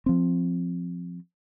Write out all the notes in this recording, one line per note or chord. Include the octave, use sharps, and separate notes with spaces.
F3 C4